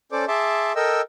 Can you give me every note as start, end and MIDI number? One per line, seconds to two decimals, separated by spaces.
0.12 0.25 61
0.12 0.25 69
0.12 0.25 72
0.12 0.25 74
0.12 0.25 86
0.28 0.73 68
0.28 0.73 76
0.28 0.73 81
0.28 0.73 84
0.28 0.73 86
0.76 1.02 69
0.76 1.02 70
0.76 1.02 75
0.76 1.02 79
0.76 1.02 88